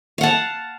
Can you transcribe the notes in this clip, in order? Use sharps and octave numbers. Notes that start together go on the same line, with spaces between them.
F5 F#5 A5